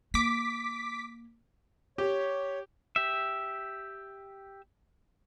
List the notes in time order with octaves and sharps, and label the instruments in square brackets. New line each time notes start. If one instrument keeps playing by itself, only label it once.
[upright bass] A#3 [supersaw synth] D6 B6
[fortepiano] G4 [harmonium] C#5
[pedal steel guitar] G4 E5